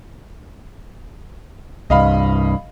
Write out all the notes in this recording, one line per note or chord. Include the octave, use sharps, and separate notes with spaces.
C2 G2 D#5 F5 B5